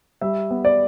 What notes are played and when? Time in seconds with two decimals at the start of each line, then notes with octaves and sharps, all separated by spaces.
0.21 G3 E5
0.51 B3
0.65 D5